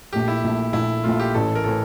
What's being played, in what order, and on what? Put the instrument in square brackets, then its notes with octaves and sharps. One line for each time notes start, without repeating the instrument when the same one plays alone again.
[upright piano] A#1 A#2 A3 [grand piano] G4
[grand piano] E4
[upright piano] A#1 A#2 A3
[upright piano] A#1 A#2 A3 [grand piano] E4
[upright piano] A#1 A#2 A3 [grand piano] F4
[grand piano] G4
[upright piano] A1 A2 E3 [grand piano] A4
[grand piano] A#4
[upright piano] A2 E3 [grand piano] A4